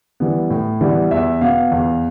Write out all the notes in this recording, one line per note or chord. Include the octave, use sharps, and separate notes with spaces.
E3 G3 B3
A2
E3 G3 B3
E2 E5
B2 B3 F5
E2